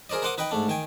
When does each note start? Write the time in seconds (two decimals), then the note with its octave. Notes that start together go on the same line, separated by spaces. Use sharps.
0.10 G#4 A#4 C5 D5 D#5
0.22 A#4 C5 F#5 C6 D6 D#6
0.38 D#4 B4 D#5 G5 B5
0.51 G#2 A3 D4
0.68 D#3 G5 G#5